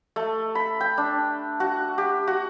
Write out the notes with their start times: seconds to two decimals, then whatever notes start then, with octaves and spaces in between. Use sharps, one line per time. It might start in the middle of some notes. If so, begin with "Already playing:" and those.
0.16 A3
0.55 B5
0.81 G5
0.98 D4
1.60 F#4
1.98 G4
2.27 F#4